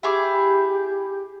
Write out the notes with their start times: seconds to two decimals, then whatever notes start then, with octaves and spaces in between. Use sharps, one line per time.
0.03 E4 G4 G#4 D6